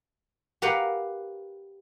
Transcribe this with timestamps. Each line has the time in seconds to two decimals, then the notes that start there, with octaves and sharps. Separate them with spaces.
0.62 G4 A#4 B4 F5 F#5